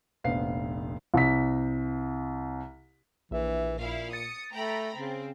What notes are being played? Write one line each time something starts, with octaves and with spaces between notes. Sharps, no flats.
F1 A#1 B3 F5 C7
C2 B6
A#1 E3 E5
A#2 E4 F5
D#6 A6 C#7
A3 G5 A#5 B5
C#3 C4